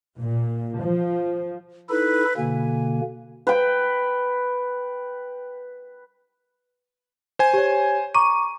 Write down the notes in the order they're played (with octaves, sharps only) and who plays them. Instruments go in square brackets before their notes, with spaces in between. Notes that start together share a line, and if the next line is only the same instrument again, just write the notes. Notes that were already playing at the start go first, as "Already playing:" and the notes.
[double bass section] A#2
F3
[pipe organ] D#4 E4 A4 [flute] B4
[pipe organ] B2 D3 A#3 [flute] G#5
[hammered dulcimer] B4 G5
[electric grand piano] C5 G#5
[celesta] G4 C#5
[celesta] A#5 C#6 D6 [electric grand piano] D#7